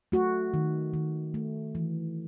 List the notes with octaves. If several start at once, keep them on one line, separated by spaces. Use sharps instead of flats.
A3 F#4
D#3
D#3
A3
E3